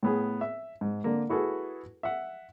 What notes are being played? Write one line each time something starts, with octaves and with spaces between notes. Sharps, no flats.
A2 B3 G#4
E5
G#2
D3 A#3
E4 F#4 G#4 A4 B4
E5 F#5